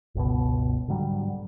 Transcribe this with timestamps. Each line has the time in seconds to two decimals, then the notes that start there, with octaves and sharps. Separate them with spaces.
0.15 G1 C#2 B2
0.88 G#2 D3 F#3 G3